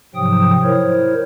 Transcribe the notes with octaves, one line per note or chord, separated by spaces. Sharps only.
G#2 C3 F3 F#3 G5 D#6
E4 A#4 C5 C#5